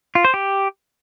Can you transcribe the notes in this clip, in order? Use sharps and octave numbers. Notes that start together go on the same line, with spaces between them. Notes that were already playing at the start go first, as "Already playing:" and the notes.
F4
C5
G4